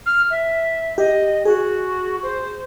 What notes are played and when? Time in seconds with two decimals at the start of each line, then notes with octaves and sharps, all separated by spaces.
0.06 F6
0.30 E5
0.98 G4 D#5
1.45 F#4 G#4
2.23 C5